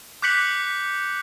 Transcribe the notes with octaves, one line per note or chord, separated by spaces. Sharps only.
D6 F#6 G6 B6 C#7 F#7